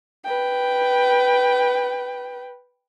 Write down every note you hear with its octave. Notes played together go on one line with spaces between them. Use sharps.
B4 G5